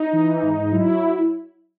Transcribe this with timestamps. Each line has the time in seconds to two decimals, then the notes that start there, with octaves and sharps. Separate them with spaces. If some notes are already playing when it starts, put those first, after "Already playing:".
Already playing: D#4
0.13 E3
0.42 G#2
0.72 F#3 E4